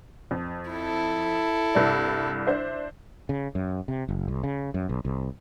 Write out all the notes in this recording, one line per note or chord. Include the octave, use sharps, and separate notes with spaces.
F2
E4 A4
C2 G2 D5
D4 C5 E5
C#3
F#2
C3
F#1
C2
C#3
F#2
B1
C2